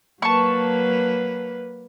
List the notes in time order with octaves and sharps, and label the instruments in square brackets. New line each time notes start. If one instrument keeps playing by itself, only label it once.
[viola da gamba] F#3 A#3 B4 [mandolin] A5 C#6